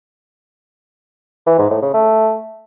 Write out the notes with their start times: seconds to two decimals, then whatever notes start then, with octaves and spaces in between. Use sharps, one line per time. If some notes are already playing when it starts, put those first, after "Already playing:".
1.47 E3
1.58 G#2
1.70 A2
1.82 C#3
1.94 A3